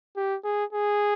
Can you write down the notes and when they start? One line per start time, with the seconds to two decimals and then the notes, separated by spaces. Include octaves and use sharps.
0.16 G4
0.44 G#4
0.73 G#4